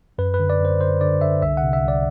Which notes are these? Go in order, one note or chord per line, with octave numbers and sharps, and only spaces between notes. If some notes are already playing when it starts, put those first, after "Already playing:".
F#2 B4
B4
D3
D5
F#2
C5
D3 C5
D3 D5
D3 E5
C2 E5
F#5
C3
E5
C2
D5